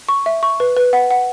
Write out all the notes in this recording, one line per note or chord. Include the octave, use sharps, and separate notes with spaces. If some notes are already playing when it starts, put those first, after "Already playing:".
C#6
E5
C#6
B4
B4
F#5
F#5